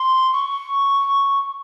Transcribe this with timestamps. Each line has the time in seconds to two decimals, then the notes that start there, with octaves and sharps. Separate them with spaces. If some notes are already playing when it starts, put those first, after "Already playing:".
Already playing: C6
0.33 C#6